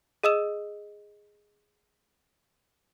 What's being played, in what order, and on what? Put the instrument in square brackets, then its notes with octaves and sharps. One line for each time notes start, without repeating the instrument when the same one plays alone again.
[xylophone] G#4 D#5 D#6 E6 E7